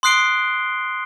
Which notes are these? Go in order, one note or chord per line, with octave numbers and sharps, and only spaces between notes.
C6 D#6 F#6 C7 D7 G7